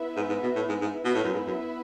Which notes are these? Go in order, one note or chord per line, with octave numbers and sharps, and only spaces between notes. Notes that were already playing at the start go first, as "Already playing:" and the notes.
Already playing: B3 E4 B4 E5
G#2
G#2
B2
A2
G#2
G#2
B3 E4 B4 E5
B2
A2
F#2
G#2
F#2